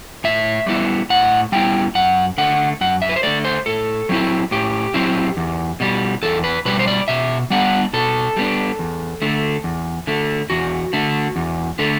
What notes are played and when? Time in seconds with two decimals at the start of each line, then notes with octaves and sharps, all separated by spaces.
0.24 A2 E5
0.66 G3 B3 E4
1.10 A2 F#5
1.52 G3 B3 E4 G5
1.95 F#2 F#5
2.38 D3 A3 F#5
2.81 F#2 F#5
3.02 E5
3.09 B4
3.16 C5
3.23 D3 A3 D5
3.45 C5
3.66 A2 A4
4.09 F#3 C4 E4
4.51 A2 G4
4.94 F#3 C4 E4
5.37 E2
5.80 B2 G3
6.23 E2 A4
6.44 B4
6.65 B2 G3 B4
6.79 C5
6.87 D5
7.08 B2 E5
7.50 G3 B3 D4 F#5
7.93 B2 A4
8.37 G3 B3 D4
8.79 E2
9.22 D3 A3
9.64 E2
10.07 D3 A3
10.50 E2 F#4
10.93 D3 A3
11.36 E2
11.79 D3 A3